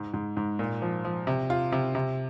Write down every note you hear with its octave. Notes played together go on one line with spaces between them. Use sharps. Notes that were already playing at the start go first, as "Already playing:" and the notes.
Already playing: G#2 G#3
G#2
G#2
A#2
F3
F3
C3
F4
C3
C3